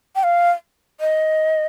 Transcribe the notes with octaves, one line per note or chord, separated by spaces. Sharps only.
G5
F5
D#5